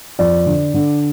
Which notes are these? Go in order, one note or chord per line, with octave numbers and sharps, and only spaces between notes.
F2 D5
D3
D3